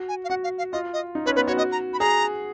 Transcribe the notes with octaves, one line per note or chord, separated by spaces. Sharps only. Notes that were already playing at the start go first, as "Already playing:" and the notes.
Already playing: F#4
G#5
F5
F#4 F#5
F5
F5
F4 D#5
D#5
D#4
C#4 B4
B3 B4
F#4 C#5
F#4 D#5
A#5
B5
G#4 A#5